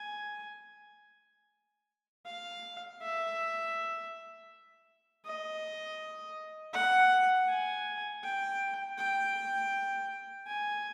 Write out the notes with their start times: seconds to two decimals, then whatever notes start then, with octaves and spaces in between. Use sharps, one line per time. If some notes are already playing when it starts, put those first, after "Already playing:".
Already playing: G#5
2.27 F5
3.01 E5
5.25 D#5
6.73 F#5
7.49 G#5
8.24 G5
8.98 G5
10.47 G#5